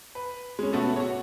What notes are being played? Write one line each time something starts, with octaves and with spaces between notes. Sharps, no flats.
B4
G#3 C#4
B2 A3 B3 C#4 F#4 A4
F#4 C#5